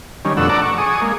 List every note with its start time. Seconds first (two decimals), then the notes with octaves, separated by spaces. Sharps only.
0.25 D#3 G3 C#4
0.37 F2 B2 A3 D4 F#5 E6
0.49 D5 F#5 A5 A#5 D6
0.62 C#6
0.78 G#4 C#6 D#6
1.01 G#3 A#3